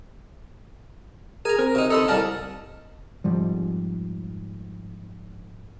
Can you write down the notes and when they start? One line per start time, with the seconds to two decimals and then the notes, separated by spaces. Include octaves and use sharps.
1.45 G#4 A#4 G#5 A#5
1.58 C4 A#4
1.75 C3 D#4
1.90 D#4 A4 B5 C6 E6
2.08 C2 A#4 D5 A5 F6
3.24 F2 G#2 F3 G3